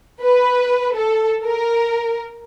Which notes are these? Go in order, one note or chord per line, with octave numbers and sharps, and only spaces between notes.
B4
A4
A#4